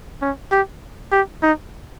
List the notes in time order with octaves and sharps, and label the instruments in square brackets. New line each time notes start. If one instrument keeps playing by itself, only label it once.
[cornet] C#4
G4
G4
D#4